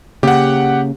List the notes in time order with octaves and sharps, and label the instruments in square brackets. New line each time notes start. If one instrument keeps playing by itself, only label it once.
[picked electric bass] C#3 A#3 [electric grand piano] G4 F#5